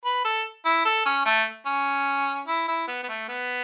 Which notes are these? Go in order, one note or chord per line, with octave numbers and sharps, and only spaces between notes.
B4
A4
E4
A4
C#4
A3
C#4
E4
E4
B3
B3
A3
B3